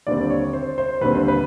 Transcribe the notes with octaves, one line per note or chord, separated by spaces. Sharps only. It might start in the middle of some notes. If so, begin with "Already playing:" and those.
D#2 D3 G3 C4 D5
C#5
C5
C5
D#2 D3 G3 C4 B4
C5
B4